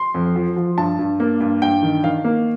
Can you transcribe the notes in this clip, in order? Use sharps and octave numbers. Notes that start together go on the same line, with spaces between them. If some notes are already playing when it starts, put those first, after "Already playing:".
Already playing: C6
F2
F3
F3
G2 A5
G2
A#3
G2
G2 G5
D#3
D#3 F5
A#3